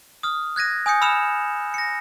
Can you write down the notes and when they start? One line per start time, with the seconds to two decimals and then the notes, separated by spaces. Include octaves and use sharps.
0.23 D#6 F6
0.56 F#6 G#6 A#6 D#7
0.86 G#5 D#6 G6 C#7
1.01 B5 E6 F6 C#7 E7 F7
1.74 A#6 C#7